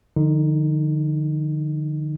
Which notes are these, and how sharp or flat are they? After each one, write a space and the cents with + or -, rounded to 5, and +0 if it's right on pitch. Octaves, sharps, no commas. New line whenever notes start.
D3 +35 F3 +0 D#4 +0